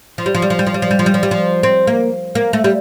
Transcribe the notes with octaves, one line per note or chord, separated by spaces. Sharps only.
F3
G3
F3
G3
F3
G3
F3
G3
F3
G3
F3
G3
F3
G3
F3
C4
A#3
A#3
A3
G3